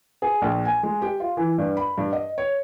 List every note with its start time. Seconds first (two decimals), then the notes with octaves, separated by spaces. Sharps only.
0.22 G#4
0.42 A#1
0.65 G#5
0.83 G#3
1.02 G4
1.20 F4
1.37 E3
1.58 G2
1.77 B5
1.98 G2
2.13 D#5
2.38 C#5